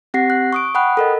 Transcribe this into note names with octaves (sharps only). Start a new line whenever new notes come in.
C4 G4 F#5 A#6 C7
F#6
C#6 D#6 D7
F#5 G5 B5 D#6 F#6
A4 A#4 D#5